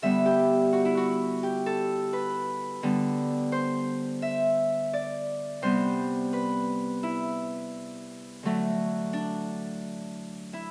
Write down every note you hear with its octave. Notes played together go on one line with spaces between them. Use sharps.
D3 G3 B3 E5
G4
F#4
E4
F#4
G4
A4
B4
D3 G3 B3
C5
E5
D5
C3 G3 B3 C5
B4
E4
D3 F#3 A3
D4
E4